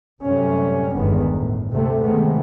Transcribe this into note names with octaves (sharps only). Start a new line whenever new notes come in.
F#2 C3 G3 A3 C#4
G1 E2 D#3 G#3 B3
F#2 A2
D2 C3 A3
C3 D#3 G#3 A3 B3